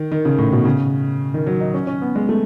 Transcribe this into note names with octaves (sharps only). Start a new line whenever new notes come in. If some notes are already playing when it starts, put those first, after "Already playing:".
Already playing: D#3
D#3
C#3
A2
B2
C#3
D#3
F#3
D#4
C#4
C#4
B3
G#3
A3